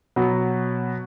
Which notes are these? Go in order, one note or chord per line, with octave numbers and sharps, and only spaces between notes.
B2 F#3 B3